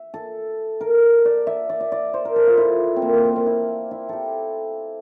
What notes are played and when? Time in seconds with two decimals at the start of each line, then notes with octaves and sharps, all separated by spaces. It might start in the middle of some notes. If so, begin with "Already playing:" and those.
Already playing: E5
0.14 A4
0.81 A#4
1.25 D5
1.47 E5
1.69 D5
1.80 D5
1.92 D5
2.14 C5
2.25 A#4
2.36 A4
2.47 F4
2.57 E4
2.96 C4
3.02 A#3
3.13 A#3
3.24 A#3
3.36 C4
3.47 E4
3.91 E4
4.09 G4 A4